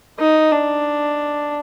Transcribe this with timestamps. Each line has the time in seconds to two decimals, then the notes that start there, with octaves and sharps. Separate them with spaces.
0.19 D#4
0.52 D4